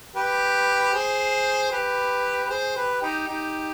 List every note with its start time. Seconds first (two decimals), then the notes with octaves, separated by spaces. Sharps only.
0.16 G4 B4
0.94 G#4 C5
1.72 G4 B4
2.45 B4
2.49 G#4 C5
2.76 G4 B4
3.02 D#4 G4
3.28 D#4 G4